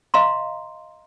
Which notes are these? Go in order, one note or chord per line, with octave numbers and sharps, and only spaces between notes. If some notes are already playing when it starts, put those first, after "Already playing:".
D#5 F5 A#5 C6